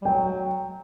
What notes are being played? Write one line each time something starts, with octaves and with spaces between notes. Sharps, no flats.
G3
F#3 G5